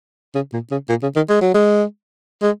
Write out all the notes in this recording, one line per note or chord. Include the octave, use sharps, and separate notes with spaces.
C#3
A#2
C#3
A#2
C#3
D#3
G#3
F#3
G#3
G#3